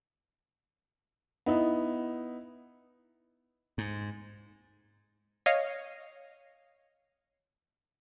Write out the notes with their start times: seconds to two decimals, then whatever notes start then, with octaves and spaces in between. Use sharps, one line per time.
1.46 B3 D#4 E4
3.78 G#2
5.46 C#5 D#5 F5